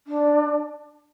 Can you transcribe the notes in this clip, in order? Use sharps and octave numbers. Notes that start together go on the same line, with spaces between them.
D4